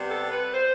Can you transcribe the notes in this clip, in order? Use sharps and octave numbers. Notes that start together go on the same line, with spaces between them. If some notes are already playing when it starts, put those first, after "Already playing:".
Already playing: C3 G3 B3
A4
B4
C5